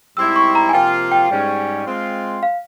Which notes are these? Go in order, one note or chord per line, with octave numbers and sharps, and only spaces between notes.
G#2 G3 C4 E4 E6
C#6
A#5
G#5
C3 F3 A#3 F4 G5
G5
G#2 G3 C#4
G#3 C4 F4
F5